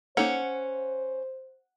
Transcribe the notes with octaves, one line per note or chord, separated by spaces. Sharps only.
A#3 C#4 D#4 A4 C5 F#5